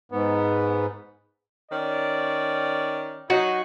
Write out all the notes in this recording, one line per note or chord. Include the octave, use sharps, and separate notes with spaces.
G#2 B3
D#3 C#4 D5
F#3 D#4 F#4